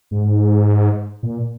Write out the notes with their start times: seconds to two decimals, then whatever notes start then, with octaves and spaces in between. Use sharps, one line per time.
0.11 G#2
1.23 A#2